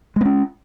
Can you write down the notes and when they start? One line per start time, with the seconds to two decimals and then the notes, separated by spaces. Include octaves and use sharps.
0.16 G#3
0.21 B3
0.25 C#4